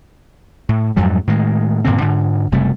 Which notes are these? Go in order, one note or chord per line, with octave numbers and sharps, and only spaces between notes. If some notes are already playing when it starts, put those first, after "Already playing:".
A2
F2 G#2 F#3 G3
A2 D#3 G#3
G2 A#2 D3 C4
G#2 D3
F#1 C3 G3 A3